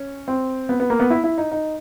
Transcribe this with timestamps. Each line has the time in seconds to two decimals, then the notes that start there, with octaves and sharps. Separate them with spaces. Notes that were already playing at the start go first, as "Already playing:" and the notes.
Already playing: C#4
0.28 C4
0.69 B3
0.80 B3
0.90 A#3
1.00 B3
1.10 E4
1.24 E4
1.38 D#4
1.52 D#4